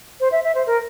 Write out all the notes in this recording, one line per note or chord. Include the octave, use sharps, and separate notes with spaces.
C5
E5
E5
C5
A#4